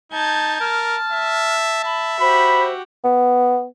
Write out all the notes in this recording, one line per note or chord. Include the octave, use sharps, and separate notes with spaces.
D#4 A5 G6 G#6
A#4 A5 F6
E5
E5 B5
F#4 G4 C5 B5
B3